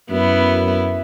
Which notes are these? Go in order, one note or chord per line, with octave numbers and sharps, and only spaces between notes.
F#2 B3 E4